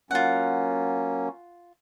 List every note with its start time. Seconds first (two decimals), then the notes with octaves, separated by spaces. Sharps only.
0.11 F#3 A#3 C#4 F4 F#5